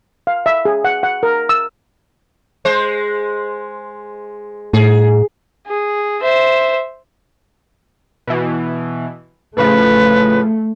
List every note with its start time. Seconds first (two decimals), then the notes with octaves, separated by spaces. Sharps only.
0.27 F5
0.46 E5
0.65 G#4
0.84 F#5
1.03 F#5
1.23 A#4
1.49 E6
2.65 G#3 C5
4.73 A2 G#4
5.67 G#4
6.21 C5 E5
8.27 B2 E3
9.57 A2 C#3 F3 A3 B4